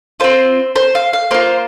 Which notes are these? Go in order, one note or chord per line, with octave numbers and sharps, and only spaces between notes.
C4 F4 C5
C5
F5
F5
A#3 F4 C5